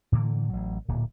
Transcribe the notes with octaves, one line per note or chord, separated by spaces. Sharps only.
A2 D3 E3 A#3
A1 F#3
D1 A#2